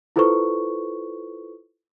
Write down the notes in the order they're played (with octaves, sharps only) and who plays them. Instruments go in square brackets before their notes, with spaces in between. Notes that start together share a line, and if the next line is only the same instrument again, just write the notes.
[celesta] E4 F4 A4 B4 C5 C#6